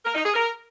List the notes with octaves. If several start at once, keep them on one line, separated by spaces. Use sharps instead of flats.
A#4
D#4
G#4
A#4